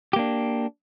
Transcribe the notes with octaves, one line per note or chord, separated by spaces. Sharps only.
A#3 D4 G4